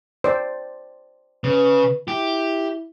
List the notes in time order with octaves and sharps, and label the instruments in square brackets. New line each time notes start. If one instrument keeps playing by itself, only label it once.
[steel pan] C5 D5
[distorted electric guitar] C#3 [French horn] B4
[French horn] E4 [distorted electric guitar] G4